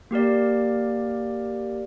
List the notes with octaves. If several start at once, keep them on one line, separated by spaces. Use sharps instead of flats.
A#3 G4 A#4 D5